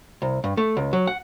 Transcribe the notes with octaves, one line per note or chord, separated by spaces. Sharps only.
C2
G2
A3
C#2
F#3
F#5